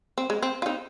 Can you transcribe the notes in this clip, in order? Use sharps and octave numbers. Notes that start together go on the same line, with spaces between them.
C4
G#3
C4
F4
C4 D#4